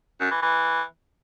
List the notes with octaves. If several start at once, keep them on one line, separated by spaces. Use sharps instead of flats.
F#2
E3
E3